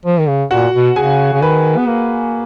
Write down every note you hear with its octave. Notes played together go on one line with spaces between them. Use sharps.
F3
D#3
C#3
A#2 F#4 F#5
B2
C#3 G#4 G#5
C#3
D#3 B4
B3
A#3